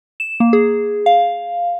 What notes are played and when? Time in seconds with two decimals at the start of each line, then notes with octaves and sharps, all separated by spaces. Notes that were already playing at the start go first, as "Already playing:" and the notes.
0.20 E7
0.40 A#3
0.53 G#4
1.06 F5